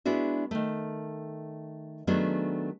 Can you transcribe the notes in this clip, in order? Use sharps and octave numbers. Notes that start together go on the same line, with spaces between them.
G#3 B3 D4 E4 F#4
D#3 A3
D#3 F#3 A3 B3 D4 G#4